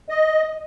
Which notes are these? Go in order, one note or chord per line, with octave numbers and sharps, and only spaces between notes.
D#5